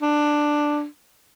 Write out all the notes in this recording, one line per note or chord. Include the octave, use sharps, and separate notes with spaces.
D4